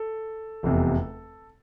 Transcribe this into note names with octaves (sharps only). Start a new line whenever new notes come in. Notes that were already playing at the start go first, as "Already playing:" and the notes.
Already playing: A4
F1 E2 C3